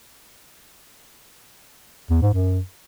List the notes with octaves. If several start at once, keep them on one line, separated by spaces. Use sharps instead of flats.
E2
G#2
F#2